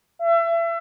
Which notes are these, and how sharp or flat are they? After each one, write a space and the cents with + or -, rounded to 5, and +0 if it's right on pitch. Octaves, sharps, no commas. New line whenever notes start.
E5 +30